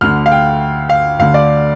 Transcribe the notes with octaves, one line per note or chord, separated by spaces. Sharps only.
D2 D3 F6
F5
G5
F5
D2 D3 F5
D5